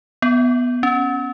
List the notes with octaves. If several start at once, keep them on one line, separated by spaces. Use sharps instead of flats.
B3
C#4